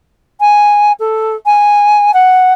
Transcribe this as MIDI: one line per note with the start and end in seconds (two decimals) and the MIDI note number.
0.40 0.92 80
1.00 1.36 69
1.46 2.13 80
2.14 2.53 78